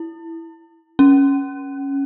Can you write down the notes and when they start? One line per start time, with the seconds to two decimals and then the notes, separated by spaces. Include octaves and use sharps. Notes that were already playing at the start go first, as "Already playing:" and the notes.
Already playing: E4
0.99 C#4